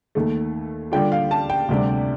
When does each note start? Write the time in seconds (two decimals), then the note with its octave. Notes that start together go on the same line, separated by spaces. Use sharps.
0.15 D#2 D#3 A3
0.92 D3 G3 D4 F4 G5
1.12 F5
1.31 A5
1.50 G5
1.69 D2 C3 G3 D4